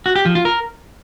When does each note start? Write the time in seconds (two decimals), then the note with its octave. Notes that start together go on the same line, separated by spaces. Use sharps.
0.06 F#4
0.16 G4
0.25 F3
0.35 F4
0.45 A#4